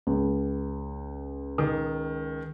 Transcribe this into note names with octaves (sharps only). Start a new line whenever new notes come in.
C#2
D#3